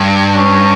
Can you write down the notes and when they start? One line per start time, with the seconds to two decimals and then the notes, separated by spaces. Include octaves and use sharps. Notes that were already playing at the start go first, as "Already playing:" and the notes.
Already playing: G2
0.36 C#4